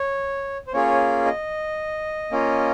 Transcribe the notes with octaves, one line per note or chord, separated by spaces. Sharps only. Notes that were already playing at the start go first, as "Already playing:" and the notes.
Already playing: C#5
C5
A#3 C#4 F4 G#4 C#5
D#5
A#3 C#4 F4